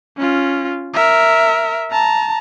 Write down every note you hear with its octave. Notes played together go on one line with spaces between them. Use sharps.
C#4 F4
A#4 E5
A5 A#5